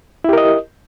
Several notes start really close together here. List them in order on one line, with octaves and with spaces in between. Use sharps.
E4 G4 A#4 D#5